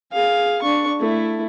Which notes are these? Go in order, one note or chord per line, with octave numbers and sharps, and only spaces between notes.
G#4 F5
D4 C#6
A3 E4